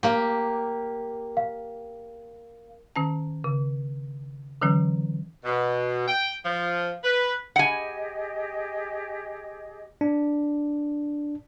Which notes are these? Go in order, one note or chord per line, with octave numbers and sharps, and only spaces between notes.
A#3 G4
F5
D#3 C#4 A5
C#3
D3 E3 F#3 C#4
B2
G5
F3
B4
G4 G#4 D#5 F#5 G#5
D4